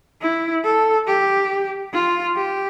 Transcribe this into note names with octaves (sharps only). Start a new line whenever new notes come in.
E4
A4
G4
F4
G4